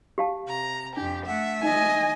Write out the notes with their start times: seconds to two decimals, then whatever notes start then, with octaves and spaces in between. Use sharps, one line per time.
0.18 G4 F5 A5
0.47 C3 A#5
0.97 F2 D4 G4
1.27 A3 E5 F#5
1.63 D#4 D#5 G#5